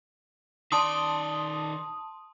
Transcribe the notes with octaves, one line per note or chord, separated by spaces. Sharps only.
D#3 D5 A5 C6 D#6